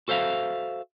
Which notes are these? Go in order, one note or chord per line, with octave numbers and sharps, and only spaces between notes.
F#4 A4 C5 E5 F5